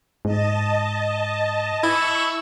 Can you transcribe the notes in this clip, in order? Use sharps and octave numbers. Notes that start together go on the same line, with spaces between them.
G#2 D#5 A5
E4 C#6 E6